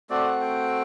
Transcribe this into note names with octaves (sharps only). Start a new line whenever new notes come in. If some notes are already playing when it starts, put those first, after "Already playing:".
A3 C4 F#4 D5
F#5
G5